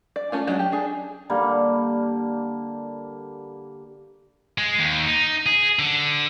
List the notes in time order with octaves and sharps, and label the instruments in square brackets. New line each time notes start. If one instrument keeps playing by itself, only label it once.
[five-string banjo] D5
A3 C#4 F4
F#3 G#3 C#4 D4 A#5
G4
D4 G#4
[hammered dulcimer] D3 G3 A#3
[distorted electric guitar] G#3
D#2
D#4
G#4
D3